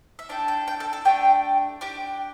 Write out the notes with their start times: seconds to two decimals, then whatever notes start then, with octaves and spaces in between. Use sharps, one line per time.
0.19 E5
0.29 D4 A4 G5
0.48 G5
0.67 G5
0.80 A4
0.93 A4
1.05 A3 D4 G4 G5
1.81 D4 G4 G5